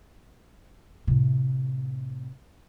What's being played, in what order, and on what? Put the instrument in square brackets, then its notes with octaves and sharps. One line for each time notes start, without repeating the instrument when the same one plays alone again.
[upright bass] A2 C3